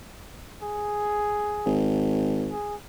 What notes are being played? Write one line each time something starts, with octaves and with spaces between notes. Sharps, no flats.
G#4
G#1
G#4